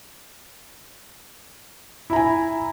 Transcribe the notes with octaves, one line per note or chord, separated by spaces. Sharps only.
E4 G#5 A#5